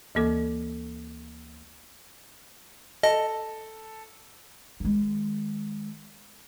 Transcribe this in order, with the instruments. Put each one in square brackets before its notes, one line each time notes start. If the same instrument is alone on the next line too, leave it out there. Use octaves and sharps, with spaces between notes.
[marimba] D2 E3 A#3 A4 D6
[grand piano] A4 [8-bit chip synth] D#5
[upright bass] D#3 G#3